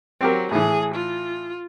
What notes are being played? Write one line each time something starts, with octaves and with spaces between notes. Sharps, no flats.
F#3 C4 G4 A#4
A2 E3 G#4
F4